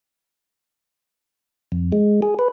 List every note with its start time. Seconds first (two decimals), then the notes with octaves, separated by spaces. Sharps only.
1.72 F2
1.92 G#3
2.22 G#4
2.39 B4